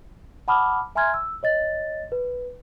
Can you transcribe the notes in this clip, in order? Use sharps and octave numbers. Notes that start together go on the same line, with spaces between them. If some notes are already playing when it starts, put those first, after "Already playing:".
F#5 A5 B5 D6 D#6 F6
E5 G#5 A#5 C6 F6 G#6
E6
C#5 D#5 A6
B4